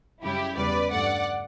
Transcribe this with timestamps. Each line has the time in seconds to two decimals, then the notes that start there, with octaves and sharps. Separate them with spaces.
0.22 F#2 C#3 G3 E4 G4
0.57 E2 C#3 G3 B4 D5
0.91 G2 E3 A3 D5 F#5